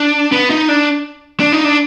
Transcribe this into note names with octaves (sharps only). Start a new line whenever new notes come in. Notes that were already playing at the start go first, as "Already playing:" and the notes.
Already playing: D4
B3
D#4
D4
D4
D#4
D4